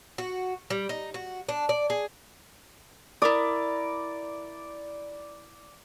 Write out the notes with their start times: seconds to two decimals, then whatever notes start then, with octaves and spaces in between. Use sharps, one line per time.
0.18 F#4
0.70 G3
0.89 D#4
1.14 F#4
1.49 D4
1.69 D5
1.90 G#4
3.22 E4 A#4 D5 D#6